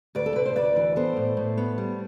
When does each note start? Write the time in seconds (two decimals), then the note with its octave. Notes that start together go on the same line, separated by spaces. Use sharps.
0.15 D2 B4 D5
0.26 A4
0.36 C3 B4
0.46 C5
0.56 D2 B4 D5
0.76 E3
0.96 B3 A4 C5
1.17 A2
1.37 A2
1.57 B3
1.78 G3